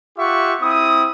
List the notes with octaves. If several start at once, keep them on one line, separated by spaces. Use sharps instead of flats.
F4 G4 E5 F#5 C#6
C4 E4 D#6